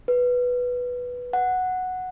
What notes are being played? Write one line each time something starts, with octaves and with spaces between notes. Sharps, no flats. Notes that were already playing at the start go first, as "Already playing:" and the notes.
B4
F#5